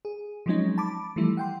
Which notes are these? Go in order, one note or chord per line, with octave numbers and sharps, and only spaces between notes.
G#4
F3 F#3 G#3 C4 C#4 D#4
A5 B5 D6
E3 F3 G3 A3 E4
F#5 G5 C6